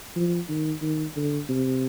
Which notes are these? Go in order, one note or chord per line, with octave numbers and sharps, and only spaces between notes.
F3
D#3
D#3
D3
C3